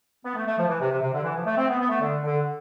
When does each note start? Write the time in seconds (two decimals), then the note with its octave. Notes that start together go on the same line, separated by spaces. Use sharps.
0.25 B3
0.35 A3
0.46 A3
0.58 F3
0.69 E3
0.80 C3
0.91 C3
1.01 C3
1.14 D3
1.23 E3
1.35 F3
1.46 A3
1.57 C4
1.68 B3
1.80 B3
1.90 A3
2.01 D3
2.23 D3